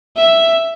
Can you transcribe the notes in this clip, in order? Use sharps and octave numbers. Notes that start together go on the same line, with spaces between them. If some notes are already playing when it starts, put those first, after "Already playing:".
E5